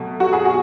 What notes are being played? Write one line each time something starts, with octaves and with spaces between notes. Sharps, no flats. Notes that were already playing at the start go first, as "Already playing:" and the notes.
Already playing: B2 F#3 A3
F#4
G#4
F#4